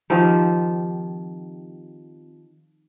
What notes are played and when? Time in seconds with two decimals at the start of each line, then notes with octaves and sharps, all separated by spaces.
0.10 D#3 F3 C4 G4